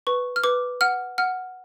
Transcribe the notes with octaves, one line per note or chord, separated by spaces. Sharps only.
B4 C#6
F6
B4 D6
F#5 F6
F#5 F6